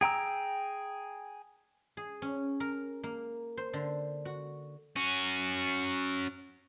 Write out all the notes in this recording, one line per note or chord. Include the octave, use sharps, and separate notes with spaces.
G#4 G5 A#5 E6
G#4
C#4
A#4
A#3
C5
D3
F#4
C#4 F#4